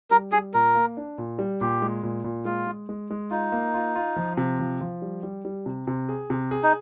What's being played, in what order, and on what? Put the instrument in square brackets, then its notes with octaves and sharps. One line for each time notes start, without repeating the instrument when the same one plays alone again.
[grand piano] G3 [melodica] A#4
[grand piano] G3 [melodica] G#4
[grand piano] A#2 [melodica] A#4
[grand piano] A#3
D4
A#2
G3
[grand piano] A#2 [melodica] G4
[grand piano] G#3
A#2
A#2
[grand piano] G#3 [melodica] F4
[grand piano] G#3
G#3
G#3
[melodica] D#4 [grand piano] F4
[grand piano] A#3
F4
F4
F3
C3
F3
F3
G3
G3
G3
C3
C3
G#4
C3
G#4
[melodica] D#4